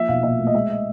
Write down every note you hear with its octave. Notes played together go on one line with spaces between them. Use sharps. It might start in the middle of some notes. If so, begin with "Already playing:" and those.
Already playing: F3 A#3 E5
B1 F5
A#2 E5
A3
D#5
G#3 E5
D#5